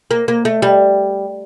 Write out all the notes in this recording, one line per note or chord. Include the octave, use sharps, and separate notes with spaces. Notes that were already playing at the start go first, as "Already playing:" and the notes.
A#3
A#3
A3
G3